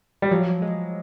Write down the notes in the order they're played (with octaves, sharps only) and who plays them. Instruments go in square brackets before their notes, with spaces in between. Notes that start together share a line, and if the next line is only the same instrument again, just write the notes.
[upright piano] G3
[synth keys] F3 [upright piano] F#3
[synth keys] G#3